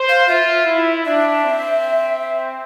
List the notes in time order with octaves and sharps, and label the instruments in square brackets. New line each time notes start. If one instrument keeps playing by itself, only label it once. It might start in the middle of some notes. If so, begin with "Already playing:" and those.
Already playing: [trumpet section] C5
[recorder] F5
[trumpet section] F4 [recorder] E5
[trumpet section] E4
[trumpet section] D4 [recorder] E5
[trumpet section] C4